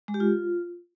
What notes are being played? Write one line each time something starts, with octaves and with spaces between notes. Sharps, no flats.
G#3
G4
F4